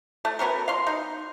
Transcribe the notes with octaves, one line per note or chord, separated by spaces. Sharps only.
A3
F#3 B3 C#4 A#4
F5 C6
D#4